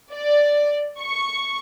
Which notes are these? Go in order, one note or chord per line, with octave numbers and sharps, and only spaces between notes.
D5
C#6